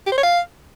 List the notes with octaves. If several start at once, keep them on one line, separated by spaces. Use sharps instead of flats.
G4
C5
C#5
F5